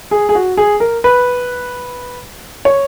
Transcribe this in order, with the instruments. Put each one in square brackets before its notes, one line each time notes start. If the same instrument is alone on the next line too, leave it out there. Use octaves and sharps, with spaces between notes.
[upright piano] G#4
G#4
F#4
G#4
A#4
B4
C#5